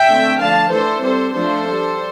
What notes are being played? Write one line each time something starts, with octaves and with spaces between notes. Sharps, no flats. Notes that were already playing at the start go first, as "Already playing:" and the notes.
Already playing: E5 G5
D3 A3 C4
D3 F3 A3 F5 A5
E3 A3 D4 A4 C5
G3 C4 A4 C5
F3 A3 D4 A4 C5
G3 D4